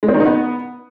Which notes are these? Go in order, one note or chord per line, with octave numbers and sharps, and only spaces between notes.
G#3
C4
D#3
D#4
B3